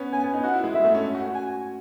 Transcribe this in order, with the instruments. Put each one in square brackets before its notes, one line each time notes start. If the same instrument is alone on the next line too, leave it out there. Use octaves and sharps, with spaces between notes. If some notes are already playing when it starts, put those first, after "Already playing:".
Already playing: [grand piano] B3 C#4
[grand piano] B3 [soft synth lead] G#5
[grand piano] B3
D#4
[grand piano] F#4 [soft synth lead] F#5
[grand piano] E4
G#3
[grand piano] G#3 [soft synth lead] E5
[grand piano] A3
C#4
F#4
F#4
[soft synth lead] G#5